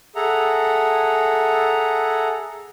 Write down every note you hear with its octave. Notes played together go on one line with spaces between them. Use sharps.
G#4 A4 E5 F#5 A#5